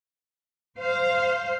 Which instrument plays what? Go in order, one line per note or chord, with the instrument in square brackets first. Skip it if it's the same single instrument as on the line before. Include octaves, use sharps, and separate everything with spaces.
[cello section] C5 F5